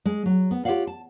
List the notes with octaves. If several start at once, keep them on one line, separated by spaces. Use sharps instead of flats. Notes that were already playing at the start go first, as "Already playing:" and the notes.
G#3
F#3
B3
F4 G4 C5 C#5 F5 F#5
A5